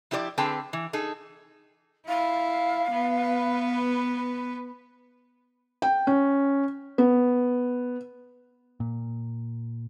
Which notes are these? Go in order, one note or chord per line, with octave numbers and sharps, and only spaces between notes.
F3 E4 G4 B4 D5
D3 C4 G#4 B4 G5 A5
E3
D#4 G#4 A4
E4 F5
B3 B4
G5
C#4
B3
A#2